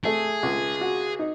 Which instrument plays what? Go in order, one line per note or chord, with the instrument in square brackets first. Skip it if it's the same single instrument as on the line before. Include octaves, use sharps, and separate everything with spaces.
[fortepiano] A3 [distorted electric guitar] G#4
[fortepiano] C#2
F#4
D#4